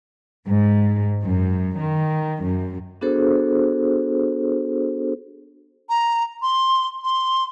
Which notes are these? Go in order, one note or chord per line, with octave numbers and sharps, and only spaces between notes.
G#2
F#2
D#3
F#2
B3 D4 F#4 G#4 A4 C5
A#5
C6
C6